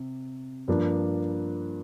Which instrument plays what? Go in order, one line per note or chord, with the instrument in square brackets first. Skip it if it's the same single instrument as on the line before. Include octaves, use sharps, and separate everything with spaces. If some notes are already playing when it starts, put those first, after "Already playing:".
Already playing: [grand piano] C3
G2 F3 A#3 D4